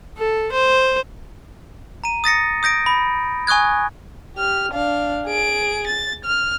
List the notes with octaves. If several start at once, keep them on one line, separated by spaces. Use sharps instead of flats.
A4
C5
A#5 D#7
D#6 A6 A#6 C#7
D#6 G6 A#6 D7
B5
G#5 C#6 D#6 F#6 G#6
G4 F6
D4 F5
G#4 D7
A6
F6